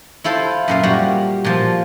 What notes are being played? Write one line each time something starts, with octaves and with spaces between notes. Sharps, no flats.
E4 F4 A4 C5
F#2 A#2 F5
G3 F#4 A#4
A#2 F3